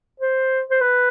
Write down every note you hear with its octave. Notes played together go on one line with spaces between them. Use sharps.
C5
C5
B4